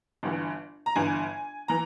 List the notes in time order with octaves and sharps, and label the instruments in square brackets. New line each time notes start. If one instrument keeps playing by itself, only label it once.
[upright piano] G1 G2 E3
A#5
G1 G2 E3 G#5
E3 A#5